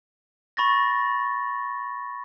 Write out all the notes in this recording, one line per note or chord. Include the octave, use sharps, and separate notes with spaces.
B5 C#6 A6 A#6